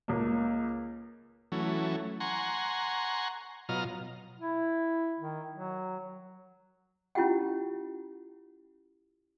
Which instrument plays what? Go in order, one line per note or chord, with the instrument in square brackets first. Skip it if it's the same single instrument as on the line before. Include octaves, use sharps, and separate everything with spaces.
[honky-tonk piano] C#2 A#3
[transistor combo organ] E3 F#3 A3 C#4
F#5 G#5 A#5 C6 C#6
B2 F#3 F4 D#5 A#5 F6
[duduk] E4
D#3
F#3
[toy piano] C#4 E4 F4 G4 F#5 G5